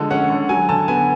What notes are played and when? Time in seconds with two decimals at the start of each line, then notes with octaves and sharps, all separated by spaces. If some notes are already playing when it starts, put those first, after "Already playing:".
Already playing: D3 F3 G#3 A4
0.10 C#4 F#5
0.30 D3
0.49 F#3 G#5
0.69 D3 A5
0.88 B3 G#5